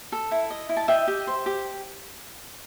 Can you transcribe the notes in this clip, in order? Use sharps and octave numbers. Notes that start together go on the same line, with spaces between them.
A4
E4
D#5
E4
A5
D#5 E5 G5
G4
C5
G4